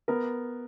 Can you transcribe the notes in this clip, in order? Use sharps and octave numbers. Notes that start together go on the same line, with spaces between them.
B3 A#4